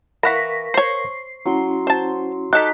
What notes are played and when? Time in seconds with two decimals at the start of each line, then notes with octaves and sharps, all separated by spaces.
0.23 E3 A#4 F5 F#5 B5 C#6 A#6 B6
0.74 C5 C#5 C7
1.46 F#3 C#4 E4 C6
1.87 C5 A5
2.53 D#4 G4 A4 F#6 B6